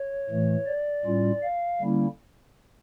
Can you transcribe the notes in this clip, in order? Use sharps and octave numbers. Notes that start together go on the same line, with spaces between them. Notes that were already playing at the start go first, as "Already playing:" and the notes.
Already playing: C#5
A2 E3 A3
D5
A2 G3 C#4 F4
F5
D3 G3 A#3 C#4 E4